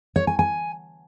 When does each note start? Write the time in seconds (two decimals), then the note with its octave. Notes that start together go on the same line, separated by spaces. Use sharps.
0.16 C#5
0.27 G#5
0.39 G#5